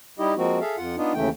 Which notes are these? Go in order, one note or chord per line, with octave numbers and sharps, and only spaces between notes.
G3 D#4 E4 G4 D#5
F3 G#3 A#3 C4 F#4
G#4 A4 E5 F5
F2 F4 F#5
B3 D4 D#4 F4
D#2 C#3 E3 A3 G5